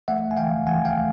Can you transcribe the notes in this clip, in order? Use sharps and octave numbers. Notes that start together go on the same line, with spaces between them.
A3 E5 F#5
G#5
E3 F5 G5
E3 F#5 G#5
F5 G5
A3